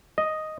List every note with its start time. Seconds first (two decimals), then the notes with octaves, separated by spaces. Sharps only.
0.18 D#5